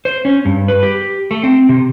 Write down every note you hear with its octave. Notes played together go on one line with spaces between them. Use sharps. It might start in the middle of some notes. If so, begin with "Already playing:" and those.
C5
C#4
G2
B4
G4
A3
C4
C3